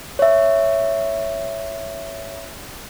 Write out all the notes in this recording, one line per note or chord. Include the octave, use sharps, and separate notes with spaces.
C#5 E5